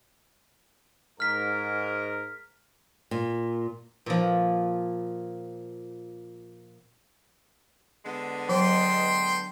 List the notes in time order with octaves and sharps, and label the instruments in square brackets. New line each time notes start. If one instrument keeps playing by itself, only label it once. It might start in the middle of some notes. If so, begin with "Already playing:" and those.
[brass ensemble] G#2 A#4 [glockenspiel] F6 B6
[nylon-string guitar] A#2
[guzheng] A#2 F3
[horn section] D3 G#3 B3
[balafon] F#3 [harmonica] G5 C6